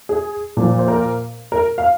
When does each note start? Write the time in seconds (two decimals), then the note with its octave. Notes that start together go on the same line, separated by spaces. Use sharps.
0.09 G#4
0.57 A#2 F3
0.79 C5
0.88 A#4
1.52 A#4
1.78 F5